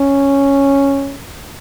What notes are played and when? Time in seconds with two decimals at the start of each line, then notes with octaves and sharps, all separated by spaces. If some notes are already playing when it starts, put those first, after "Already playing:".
Already playing: C#4